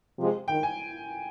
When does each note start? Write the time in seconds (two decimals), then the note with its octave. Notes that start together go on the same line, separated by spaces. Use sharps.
0.16 C3 F3 G#3
0.48 D#3 G5
0.63 G#5